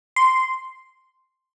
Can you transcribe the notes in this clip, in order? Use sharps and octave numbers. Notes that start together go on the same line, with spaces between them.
C6